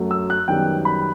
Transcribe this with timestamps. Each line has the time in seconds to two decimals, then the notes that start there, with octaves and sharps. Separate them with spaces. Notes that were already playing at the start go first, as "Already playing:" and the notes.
Already playing: F#2 F#3 A3
0.11 E6
0.30 F#6
0.48 F#2 D#3 G3 B3 G5
0.85 B5